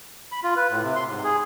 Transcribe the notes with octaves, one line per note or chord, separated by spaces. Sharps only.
B5
F4
B4
A2
C3
C6
G#2
G#4